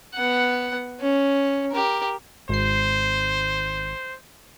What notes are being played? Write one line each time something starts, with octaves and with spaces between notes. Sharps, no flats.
B3 F#5
C#4
G4 A#4
G#1 C5 C7